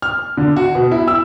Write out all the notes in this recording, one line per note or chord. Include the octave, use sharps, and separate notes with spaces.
F6
D3
F#4
B2
E4
E6